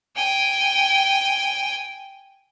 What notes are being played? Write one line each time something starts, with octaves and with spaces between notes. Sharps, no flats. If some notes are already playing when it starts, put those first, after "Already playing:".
G5 G#5